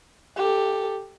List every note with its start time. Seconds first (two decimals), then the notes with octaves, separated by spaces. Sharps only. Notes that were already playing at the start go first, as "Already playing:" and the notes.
0.37 G4 A4